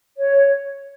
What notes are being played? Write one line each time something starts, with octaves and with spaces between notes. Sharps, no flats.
C#5